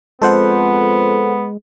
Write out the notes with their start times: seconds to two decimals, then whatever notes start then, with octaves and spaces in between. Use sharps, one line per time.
0.22 F2 G#3 B3 A4 C5 F#5